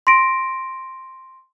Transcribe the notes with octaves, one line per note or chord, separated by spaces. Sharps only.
C6 A#6 D7